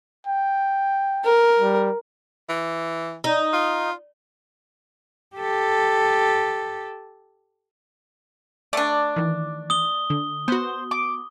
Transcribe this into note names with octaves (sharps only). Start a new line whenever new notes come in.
G5
A#4
G3
E3
D#4
F4
G4 A4
A3 D4 D5
D#3 E3
D#6 G7
D3
B3 F#4 C5
D6